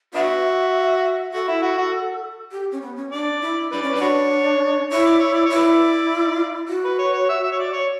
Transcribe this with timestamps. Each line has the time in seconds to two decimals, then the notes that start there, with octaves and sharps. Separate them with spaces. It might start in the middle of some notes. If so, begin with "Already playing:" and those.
0.14 B3 D4 F#4 E5
1.33 F#4 A4
1.48 E4
1.62 F#4
1.78 F#4
2.52 G4
2.72 C#4
2.81 B3
2.96 C#4
3.12 D4 D5
3.41 E4
3.72 D4 B4 D5
3.83 C#4
3.91 D4 B4
4.01 F#4 C#5
4.90 E4 C#5
5.06 D5
5.20 C#5
5.34 D5
5.46 E4 C#5
5.55 B4 D5
6.68 F#4
6.84 B4
6.99 C#5
7.13 C#5
7.29 E5
7.43 E5
7.52 C#5
7.59 D5
7.73 C#5